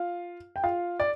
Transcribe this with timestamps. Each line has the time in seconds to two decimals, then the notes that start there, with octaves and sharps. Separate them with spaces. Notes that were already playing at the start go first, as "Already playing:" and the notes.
Already playing: F4 F5
0.56 G5
0.64 F4 F5
1.00 D5